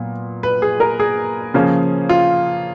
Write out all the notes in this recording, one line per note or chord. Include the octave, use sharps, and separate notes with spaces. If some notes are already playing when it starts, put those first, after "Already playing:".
Already playing: A#2 F#3 B3
B4
G#4
A#4
G#4
C#3 F3 A#3 C#4
F4